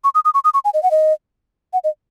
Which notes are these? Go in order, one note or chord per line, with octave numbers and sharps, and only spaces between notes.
C#6
D#6
D#6
C#6
D#6
C#6
G#5
D#5
F#5
D#5
F#5
D#5